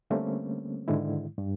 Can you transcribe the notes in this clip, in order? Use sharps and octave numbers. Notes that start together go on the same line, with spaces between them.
D3 G3 A3 A#3 C4 C#4
G#2 D3 D#3 G#3 E4
G2